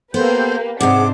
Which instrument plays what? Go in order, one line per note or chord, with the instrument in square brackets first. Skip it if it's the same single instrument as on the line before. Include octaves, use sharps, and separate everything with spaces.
[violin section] A#3 G4 B4 [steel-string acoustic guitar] B3 [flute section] A4 G6 [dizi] C5
[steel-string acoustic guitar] G#2 C3 [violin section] D4 C5 [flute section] G#4 F#5 [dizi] D6